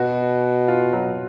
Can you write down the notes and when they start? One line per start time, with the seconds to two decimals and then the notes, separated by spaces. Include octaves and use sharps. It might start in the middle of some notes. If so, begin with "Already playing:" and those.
Already playing: B2 F#4
0.68 F4
0.93 F#3